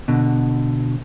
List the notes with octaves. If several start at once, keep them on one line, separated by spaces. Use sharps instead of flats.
B2 D3